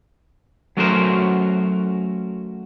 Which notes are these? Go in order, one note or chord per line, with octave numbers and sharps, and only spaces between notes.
F#3 A3 C#4 F#4 A#4 C5